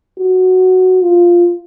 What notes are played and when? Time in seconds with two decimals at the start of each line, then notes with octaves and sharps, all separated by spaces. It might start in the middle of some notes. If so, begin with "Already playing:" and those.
0.20 F#4
1.03 F4